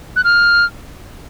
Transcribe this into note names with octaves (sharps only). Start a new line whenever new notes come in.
F#6
F6